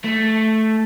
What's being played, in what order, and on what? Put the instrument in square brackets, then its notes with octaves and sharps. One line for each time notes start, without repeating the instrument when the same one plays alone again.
[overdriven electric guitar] A3